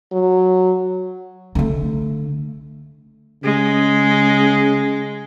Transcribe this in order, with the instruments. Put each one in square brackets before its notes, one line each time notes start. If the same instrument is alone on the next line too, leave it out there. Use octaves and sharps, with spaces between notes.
[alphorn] F#3
[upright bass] D3 A3
[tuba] C#3 [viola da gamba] G#3